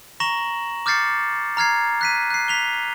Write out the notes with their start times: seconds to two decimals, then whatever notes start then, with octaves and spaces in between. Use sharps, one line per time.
0.20 A#5 C#6 A#6 E7 F#7
0.86 D6 F6 G6 A6 C7 C#7
1.57 A#5 F6 G#6 C7
2.01 F#6 B6 D#7
2.30 F#6 C7
2.48 B6 F7 G7